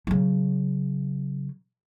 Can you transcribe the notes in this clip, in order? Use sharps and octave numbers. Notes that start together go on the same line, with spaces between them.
C#3 F#3